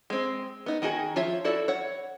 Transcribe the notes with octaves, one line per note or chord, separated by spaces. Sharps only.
G#3 C4
B3 D#4
D#3 D#4 F#4 G#4 G#5
F3 F4 C#5 E5
E4 F#4 A4 D5
C#5 F#5